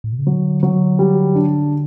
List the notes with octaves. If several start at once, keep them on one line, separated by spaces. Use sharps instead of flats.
A2
B2
C#3
D3 F#3
F#3
G3
D4